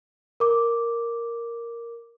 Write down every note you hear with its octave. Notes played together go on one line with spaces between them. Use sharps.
A#4 D6